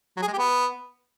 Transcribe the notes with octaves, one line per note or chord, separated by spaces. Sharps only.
F#3
G#4
G#3
G4
B3